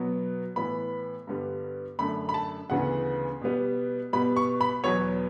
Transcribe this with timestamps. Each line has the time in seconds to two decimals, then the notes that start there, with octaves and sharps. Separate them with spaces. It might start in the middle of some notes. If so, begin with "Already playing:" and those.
Already playing: B2 F#3 B3
0.56 A2 E3 B3 B5
1.27 G2 D3 G3 B3
1.99 F#2 D3 A3 B5
2.29 B5
2.34 A5
2.70 D2 C#3 E3 B3 F#5
3.41 B2 G3 B3
4.13 B2 G3 B3 B5
4.36 C#6
4.61 B5
4.84 E2 B2 F#3 B3 C#5